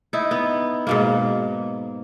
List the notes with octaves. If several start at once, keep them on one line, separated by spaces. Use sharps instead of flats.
D#4 E4
B3
G#2 B2 A#3